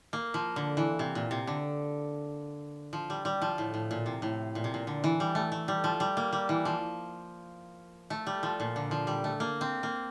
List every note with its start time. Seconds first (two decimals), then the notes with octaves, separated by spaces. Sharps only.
0.13 A#3
0.34 F3
0.56 D3
0.77 E3
0.99 C3
1.15 A#2
1.31 C3
1.47 D3
2.93 F3
3.10 G3
3.25 G3
3.42 F3
3.58 A2
3.74 A2
3.91 A#2
4.06 C3
4.22 A2
4.55 A#2
4.64 C3
4.74 A#2
4.87 D3
5.04 E3
5.20 G3
5.35 A3
5.52 A3
5.68 G3
5.84 F3
6.00 G3
6.17 A#3
6.33 G3
6.49 E3
6.65 F3
8.10 A3
8.26 G3
8.43 F3
8.60 A#2
8.76 D3
8.91 F3
9.07 G3
9.24 A3
9.40 A#3
9.61 C4
9.83 A#3